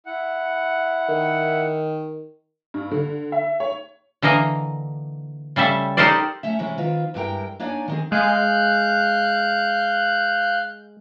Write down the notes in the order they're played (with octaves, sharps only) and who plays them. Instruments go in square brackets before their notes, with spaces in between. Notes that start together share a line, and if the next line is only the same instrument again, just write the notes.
[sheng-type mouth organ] E4 F#5
[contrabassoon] D#3
[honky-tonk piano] G2
D3
E5
C#5
[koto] D3 E3 A#3 D#5 A#5
C#3 G3 A4 E5
D#4 G4 A4 A#4 C5 D5
[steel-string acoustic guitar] A3 C#4 E5
C3 E3 G#3 C#4 E4
D#3 C4 F4 B4
G2 G#3 A3 E4 A#4 G5
A#3 D4 D#4 C#5 D5 G#5
D#3 C4 G#4
[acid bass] G#3 [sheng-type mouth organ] F5 F#6 G6